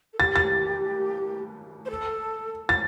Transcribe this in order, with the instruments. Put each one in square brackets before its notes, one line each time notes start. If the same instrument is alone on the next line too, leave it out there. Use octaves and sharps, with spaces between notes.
[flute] A4
[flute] G4 [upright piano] A6
[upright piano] A6
[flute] C5
A4
[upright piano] A6